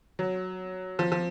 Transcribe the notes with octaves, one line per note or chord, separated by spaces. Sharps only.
F#3
F3
F3